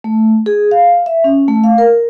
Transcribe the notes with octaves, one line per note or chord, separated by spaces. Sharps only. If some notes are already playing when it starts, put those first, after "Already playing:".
A3
G#4
F5
E5
C#4
A3
F5
A#4